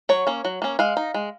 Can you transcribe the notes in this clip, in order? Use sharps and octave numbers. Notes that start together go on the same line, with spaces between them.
F#3 C#5
A#3 C#4
F#3
A#3 C#4
G#3 F5
D#4
G#3